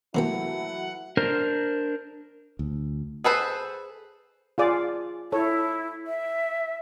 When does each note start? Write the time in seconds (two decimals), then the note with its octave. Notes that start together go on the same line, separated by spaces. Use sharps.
0.15 C3 E3 F#3 A3 A#3 E4 F#5 G5
1.17 D4 A#4 C5
2.59 D2
3.24 G#4 A4 B4 C5
4.58 F4 G#4 D5
5.32 E4 A4 C#5
6.07 E5